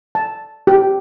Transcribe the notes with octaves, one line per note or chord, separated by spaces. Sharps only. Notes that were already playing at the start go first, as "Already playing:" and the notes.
A5
G4